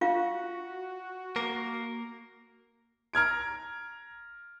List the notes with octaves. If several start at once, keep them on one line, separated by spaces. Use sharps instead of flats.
F4 F#4 F5
A#3 A#4
A#5 F6 G#6 D7